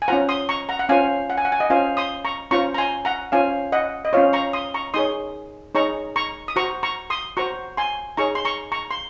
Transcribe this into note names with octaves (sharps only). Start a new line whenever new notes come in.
G#5
C#4 F4 C5 F#5 A#5
C6 D#6
A#5 C#6
F#5 A#5
F#5
C#4 F4 C5 F5 G#5
F#5
G#5
F#5
G#5
D#5 F#5
C#4 F4 C5 F5 G#5
C6 D#6
A#5 C#6
C#4 F4 C5 A#5 C#6
A#5
G#5 C6
F#5 A#5
C#4 F4 C5 F5 G#5
D#5 F#5
D#5
C#4 F4 C5 C#5 F5
A#5 C#6
C6 D#6
A#5 C#6
D#4 G#4 C#5 C6 D#6
D#4 G#4 C#5 A#5 C#6
A#5 C#6
D#6
F#4 C5 A#5 C#6
A#5 C#6
C6 D#6
F#4 C5 A#5 C#6
G#5 C6
D#4 G#4 C#5 A#5 C#6
C6
A#5 C#6
A#5 C#6
C6